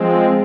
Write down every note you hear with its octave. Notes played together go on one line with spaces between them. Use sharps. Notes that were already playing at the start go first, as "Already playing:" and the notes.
Already playing: F3 G#3 C4